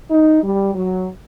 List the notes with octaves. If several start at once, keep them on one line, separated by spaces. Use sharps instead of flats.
D#4
G3
F#3